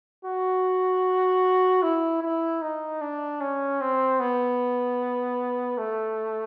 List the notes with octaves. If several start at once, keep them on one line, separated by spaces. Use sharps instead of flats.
F#4
E4
E4
D#4
D4
C#4
C4
B3
A3